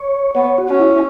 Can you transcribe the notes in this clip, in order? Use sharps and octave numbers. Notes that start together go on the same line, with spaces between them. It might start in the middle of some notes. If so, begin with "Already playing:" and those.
Already playing: C#5
B3 C#5
F#4
C#4
E4